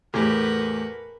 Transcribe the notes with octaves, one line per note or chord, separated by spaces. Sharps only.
E2 A2 G4 A#4 B4 F#5